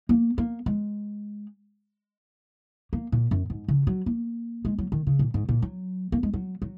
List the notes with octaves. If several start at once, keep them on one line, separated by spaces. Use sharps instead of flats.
A#3
A#3
G#3
A#3
A#2
F#2
G#2
C#3
F#3
A#3
G#3
F#3
D#3
C#3
A#2
G#2
A#2
F#3
A#3
G#3
F#3
F#3